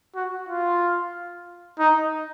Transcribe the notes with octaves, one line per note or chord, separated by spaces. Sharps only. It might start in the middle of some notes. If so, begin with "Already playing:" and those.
F#4
F4
D#4